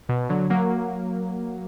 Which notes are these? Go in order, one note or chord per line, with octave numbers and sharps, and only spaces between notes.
B2
D3 F#3
F#3 A#3